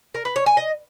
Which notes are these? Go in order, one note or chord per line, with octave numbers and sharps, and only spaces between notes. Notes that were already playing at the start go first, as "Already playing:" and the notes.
A#4
B4
C#5
G#5
D#5